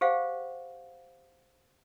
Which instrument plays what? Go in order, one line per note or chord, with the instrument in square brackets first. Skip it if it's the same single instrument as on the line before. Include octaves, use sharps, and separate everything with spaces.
[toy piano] G4 G#4 C5 F5 F#5